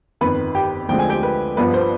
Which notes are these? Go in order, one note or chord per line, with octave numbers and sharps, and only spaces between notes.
G1 F2 D#3 B4 B5
G4 G5
D2 D3 F3 G#3 C4 G5
G#5
G4 G5
B4
G1 G2 F3 B3 B4
C5